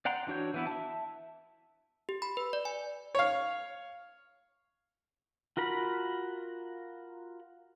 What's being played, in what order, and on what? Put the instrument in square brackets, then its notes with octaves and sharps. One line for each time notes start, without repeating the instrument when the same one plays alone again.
[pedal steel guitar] D5 F#5 G5 A#5 C6
E3 D4 F#4 C#5 G6
E3 B3 E4
E5 A5
[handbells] G4
B5
B4
D5
G#5
[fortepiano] C#5 F5
[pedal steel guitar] F4 F#4 A#4 B5